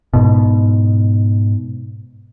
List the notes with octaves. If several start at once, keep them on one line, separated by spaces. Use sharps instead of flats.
G#2 B2